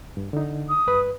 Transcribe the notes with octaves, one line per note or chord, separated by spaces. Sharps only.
G2
D3 D#4
D#6
G2 B4